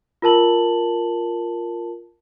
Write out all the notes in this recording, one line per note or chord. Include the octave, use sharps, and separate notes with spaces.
F4 A#4 A5 F#7